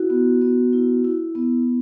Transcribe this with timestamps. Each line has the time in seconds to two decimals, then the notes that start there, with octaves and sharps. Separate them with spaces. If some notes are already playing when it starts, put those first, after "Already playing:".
Already playing: E4 F#4
0.10 B3
0.42 B3
0.73 E4
1.04 E4
1.35 B3